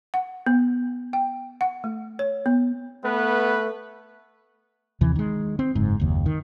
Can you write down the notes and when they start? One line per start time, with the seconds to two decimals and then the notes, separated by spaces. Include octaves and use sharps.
0.14 F#5
0.46 B3
1.13 G5
1.61 F#5
1.84 A3
2.19 C#5
2.46 B3
3.04 A3 B3 B4
5.01 D#2 C3 E3
5.16 D#3 G#3
5.59 C4
5.75 F#1 G#2
6.00 F#1 D#2
6.26 D#3